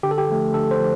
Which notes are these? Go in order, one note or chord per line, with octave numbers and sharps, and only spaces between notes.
D3 G4
A4
G4
F3 A3
D3 A4
C5
F3